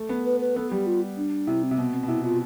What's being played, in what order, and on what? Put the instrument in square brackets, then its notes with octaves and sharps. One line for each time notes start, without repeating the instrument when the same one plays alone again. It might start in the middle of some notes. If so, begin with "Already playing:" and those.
Already playing: [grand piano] A3
B3
[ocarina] B4
B4
[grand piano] B3 [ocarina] A4
[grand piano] G3 [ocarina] G4
[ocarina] F4
D4
[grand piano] C3 [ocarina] E4
[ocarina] C4
[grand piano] C3
[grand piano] B2 [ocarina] B3
[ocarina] C4
[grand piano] B2
[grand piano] C3 [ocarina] E4
[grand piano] B2 [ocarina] F4